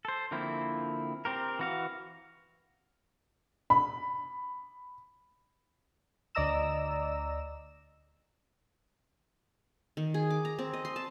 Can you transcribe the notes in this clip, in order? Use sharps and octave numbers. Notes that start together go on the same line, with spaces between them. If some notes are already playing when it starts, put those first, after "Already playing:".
A4 C5
D3 F3 A#3 C4 E4
C4 G4 A#4
E3 F#4 F5
B5
D2 D5 D#5 A#5 E6 E7
D#3
G#4
D6
A#5
C4
D#5
C6
A5